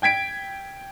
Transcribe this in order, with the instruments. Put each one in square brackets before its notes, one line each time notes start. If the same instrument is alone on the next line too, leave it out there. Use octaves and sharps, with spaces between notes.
[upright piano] G5 G#6 B6 D7